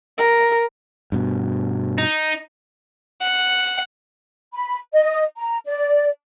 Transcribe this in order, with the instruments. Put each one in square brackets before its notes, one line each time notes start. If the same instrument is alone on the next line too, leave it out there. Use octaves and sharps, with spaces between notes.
[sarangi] A#4
[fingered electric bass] G2 B2
[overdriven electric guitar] D#4
[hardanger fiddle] F#5
[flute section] B5
D#5
A#5
D5